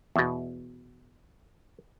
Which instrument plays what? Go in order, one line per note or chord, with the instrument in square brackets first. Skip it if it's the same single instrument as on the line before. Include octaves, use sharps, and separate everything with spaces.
[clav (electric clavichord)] E2 B2